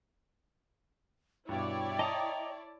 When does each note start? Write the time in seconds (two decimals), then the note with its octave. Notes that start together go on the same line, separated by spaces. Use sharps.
1.49 G2 B2 E4 C#5 D5 G5 D6
1.99 D#5 E5 A5 A#5 D#6